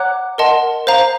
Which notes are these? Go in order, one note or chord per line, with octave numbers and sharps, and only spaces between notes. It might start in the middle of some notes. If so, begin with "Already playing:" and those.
Already playing: C#5 F#5 A#5 D6 F#6
A#4 D#5 F#5 A5 C6
C5 F5 A#5